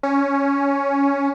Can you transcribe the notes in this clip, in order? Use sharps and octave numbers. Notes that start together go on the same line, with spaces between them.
C#4